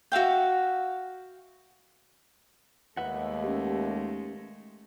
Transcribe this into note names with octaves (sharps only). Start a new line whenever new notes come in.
F#4 E5 F5 G5
D#2 G#3 A3 B4 E5 F#5
C#4 G4